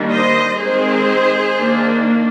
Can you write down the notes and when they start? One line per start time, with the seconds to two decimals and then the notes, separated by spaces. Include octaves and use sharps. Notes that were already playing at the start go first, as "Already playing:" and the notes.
Already playing: D#3 G3 A#3 D4
0.12 C5 D#5
0.60 D#3 G#3 C4 G#4 C5
1.58 D#3 A#3 D4